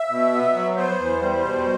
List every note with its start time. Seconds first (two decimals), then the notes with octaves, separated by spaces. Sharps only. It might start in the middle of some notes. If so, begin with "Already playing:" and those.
Already playing: E5
0.10 B2
0.32 B3
0.54 F#3
0.77 B3 C5
1.00 E2
1.21 G3
1.44 B2